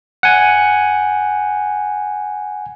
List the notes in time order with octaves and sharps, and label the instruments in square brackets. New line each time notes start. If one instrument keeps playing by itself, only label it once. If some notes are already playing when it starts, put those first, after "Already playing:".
[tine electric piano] F#5 G#5